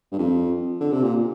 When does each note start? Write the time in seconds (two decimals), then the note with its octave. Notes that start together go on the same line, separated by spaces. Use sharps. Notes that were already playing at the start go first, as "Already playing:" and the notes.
0.12 G2
0.19 F2
0.80 D3
0.93 C3
1.03 A#2